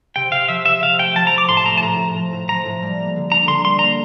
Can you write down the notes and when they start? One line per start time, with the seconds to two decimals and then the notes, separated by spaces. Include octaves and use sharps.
0.16 C3 G5
0.32 C3 F5
0.48 F3 E5
0.66 C3 E5
0.83 C3 F5
0.99 A3 G5
1.15 F3 A5
1.27 F3 A#5
1.38 D6
1.48 A2 C6
1.57 A5
1.65 A3 A#5
1.77 A5
1.83 A2 A#5
1.99 A2
2.15 F3
2.33 A2
2.49 F3 A#5
2.65 A2
2.82 G3
2.98 A#3
3.16 D3
3.32 D4 A#5
3.48 D3 C6
3.65 G3 C6
3.79 A#3 A#5